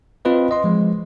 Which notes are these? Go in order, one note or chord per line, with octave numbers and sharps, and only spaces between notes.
C4 F4 B4 D#5
D#5 C6
F3 G#3